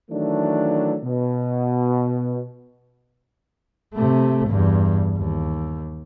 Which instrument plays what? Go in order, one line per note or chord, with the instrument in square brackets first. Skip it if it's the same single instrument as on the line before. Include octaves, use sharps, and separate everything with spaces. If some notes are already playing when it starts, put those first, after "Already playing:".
[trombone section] D#3 E3 F#3 A3 D4
B2
[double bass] C3 A3
E2 G2
D#2